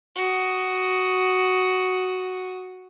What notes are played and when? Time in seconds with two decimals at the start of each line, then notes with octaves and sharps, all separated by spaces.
0.16 F#4 D#6